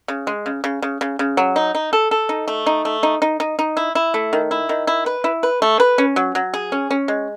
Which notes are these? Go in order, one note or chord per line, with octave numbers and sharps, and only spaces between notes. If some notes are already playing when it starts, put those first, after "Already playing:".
C#3
G#3
C#3
C#3
C#3
C#3
C#3
F#3
D#4
D#4
A4
A4
D#4
A3
D#4
A3
D#4
D#4
D#4
D#4
E4
E4
A3
D#3
E4
D#3
E4
B4
E4
B4
A3
B4
C#4
F#3
F#3
G#4
C#4
C#4
G#3